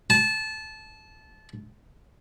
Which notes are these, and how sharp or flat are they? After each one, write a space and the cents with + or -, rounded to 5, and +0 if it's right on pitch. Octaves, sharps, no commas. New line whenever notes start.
A5 -20